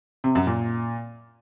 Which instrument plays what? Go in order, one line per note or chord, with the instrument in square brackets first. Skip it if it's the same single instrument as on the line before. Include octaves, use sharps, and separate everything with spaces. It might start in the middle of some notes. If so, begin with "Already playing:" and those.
[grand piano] C3
F#2
A#2